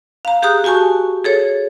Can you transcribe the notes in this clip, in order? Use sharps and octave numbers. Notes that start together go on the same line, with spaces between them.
F5 A#5
G4 G#4 A#5 D#6 F#6
F#4 G4 G#5 A5 C#6
G#4 A4 C#5